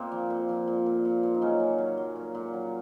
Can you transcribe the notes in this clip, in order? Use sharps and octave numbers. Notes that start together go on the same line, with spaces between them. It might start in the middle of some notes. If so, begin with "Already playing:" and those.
Already playing: A#2 A#3 C4 F4
F3
A#2
F3
A#2
A#2
A#2
A#2
D#4
C#3 F#3 C#4
A#2
F#3
F#3
A#2
A#2
F#3